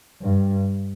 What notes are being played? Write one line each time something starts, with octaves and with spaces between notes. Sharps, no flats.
G2